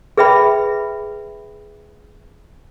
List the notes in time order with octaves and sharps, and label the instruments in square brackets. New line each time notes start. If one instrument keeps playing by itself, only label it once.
[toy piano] G#4 B4 E5 G5 B5